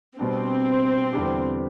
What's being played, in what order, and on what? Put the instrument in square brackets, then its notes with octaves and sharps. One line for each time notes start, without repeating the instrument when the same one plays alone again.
[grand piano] B2 G3 D4 [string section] C4
[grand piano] E2 D3 G3 D4 G4